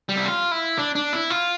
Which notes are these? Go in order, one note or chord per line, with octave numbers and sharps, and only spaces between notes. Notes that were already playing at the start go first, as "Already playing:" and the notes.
G3
E4
F4
E4
D4
D4
E4
F4